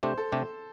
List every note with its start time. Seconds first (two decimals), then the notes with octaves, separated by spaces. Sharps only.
0.03 C3 A3 D4 G4 C5
0.18 A4
0.32 C3 A3 D4 G4